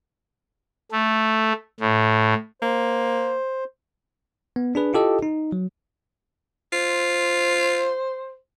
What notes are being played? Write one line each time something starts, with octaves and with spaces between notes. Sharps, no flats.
A3
A2
A#3 C5
B3
D4 G#4 B4
E4 F4 G4 A4 D#5
D#4
F#3
F4 C5